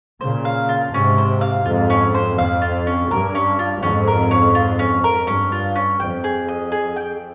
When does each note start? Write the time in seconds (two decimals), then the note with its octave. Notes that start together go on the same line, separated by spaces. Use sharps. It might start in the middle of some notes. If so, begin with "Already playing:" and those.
0.21 A#2 C#3 C5
0.45 F5
0.69 F4
0.93 G#2 C3 C#4
1.18 C5
1.41 F5
1.66 F2 G#2 F4
1.90 C#4
2.14 C5
2.38 F2 F5
2.62 F4
2.87 C#4
3.11 G2 A#4
3.35 C#4
3.59 F4
3.83 F2 G#2 C#4
4.07 A#4
4.31 C#4
4.55 F4
4.79 C#4
5.04 A#4
5.27 G2 C#4
5.52 F4
5.75 C#4
5.99 F2 G5
6.24 G#4
6.48 D#5
6.72 G#4
6.96 G5